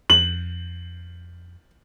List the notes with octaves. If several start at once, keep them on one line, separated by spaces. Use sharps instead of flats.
F2 F#7